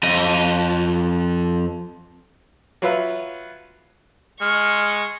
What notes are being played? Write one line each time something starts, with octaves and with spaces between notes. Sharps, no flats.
F2 D#5
F#3 F4 B4 E5
G#3 C#6 F6